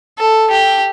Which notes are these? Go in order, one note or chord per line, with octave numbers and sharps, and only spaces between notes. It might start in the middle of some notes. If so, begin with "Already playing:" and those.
A4
G4